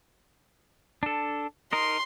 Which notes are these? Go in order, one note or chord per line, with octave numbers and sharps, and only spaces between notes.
D4 A4
D#4 A#4 D#5 C6